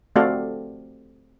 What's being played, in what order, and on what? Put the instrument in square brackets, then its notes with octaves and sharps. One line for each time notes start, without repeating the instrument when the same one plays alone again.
[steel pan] A3 C4 F#4 A4 D5 F5